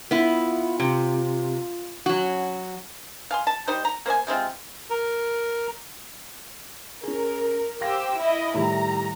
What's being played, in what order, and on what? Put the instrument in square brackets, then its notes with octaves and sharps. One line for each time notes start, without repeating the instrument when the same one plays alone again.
[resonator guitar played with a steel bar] B3 E4 [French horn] F4
[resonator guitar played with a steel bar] C3
[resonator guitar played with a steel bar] F#3 F#4 [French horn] C#4
[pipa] F5 G#5 C6
A5
G3 D#4 C5
A#5
A#3 C5 D5 G#5
C3 G#3 C4 F4
[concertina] A#4
[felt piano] C#4 G#4 [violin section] A#4
[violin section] G4 C5 E6 [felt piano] F5 A#6
[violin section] E4 D#5
[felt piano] A2 D#3 G3 [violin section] A#5